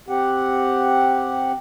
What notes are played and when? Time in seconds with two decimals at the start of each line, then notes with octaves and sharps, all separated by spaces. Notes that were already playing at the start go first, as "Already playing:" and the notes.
0.08 C4 G4 F#5